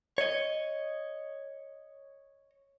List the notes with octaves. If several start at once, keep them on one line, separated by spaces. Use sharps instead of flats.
C#5 D#5